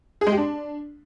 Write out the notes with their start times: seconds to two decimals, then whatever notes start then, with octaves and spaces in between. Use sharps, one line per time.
0.21 G#4
0.27 G#3
0.32 G4
0.37 D4